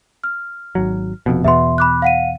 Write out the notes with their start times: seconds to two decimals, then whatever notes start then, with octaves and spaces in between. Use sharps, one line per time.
0.24 F6
0.75 G#1 F#3
1.26 F1 F2 B2
1.44 E2 B2 B3 E5 C6
1.78 B5 D6 F#6
2.02 F5 F#5 D#7